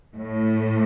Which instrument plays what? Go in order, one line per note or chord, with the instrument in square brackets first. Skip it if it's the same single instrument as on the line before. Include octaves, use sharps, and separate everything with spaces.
[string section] A2